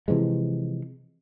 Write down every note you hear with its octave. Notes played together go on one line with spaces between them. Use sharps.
C3 E3 F3 G#3